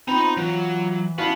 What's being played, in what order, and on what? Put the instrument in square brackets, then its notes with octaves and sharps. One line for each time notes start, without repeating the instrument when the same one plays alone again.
[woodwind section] B3 F4 [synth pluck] C4 [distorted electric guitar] D#4 A#5 [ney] B5
[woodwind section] E3 [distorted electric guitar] F#3 [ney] F4
[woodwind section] G3 C#4 F5 [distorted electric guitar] B3 [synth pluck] E4 F#4 [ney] A5